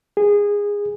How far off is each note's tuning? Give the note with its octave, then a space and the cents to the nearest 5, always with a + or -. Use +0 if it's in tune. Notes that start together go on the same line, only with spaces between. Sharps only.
G#4 -20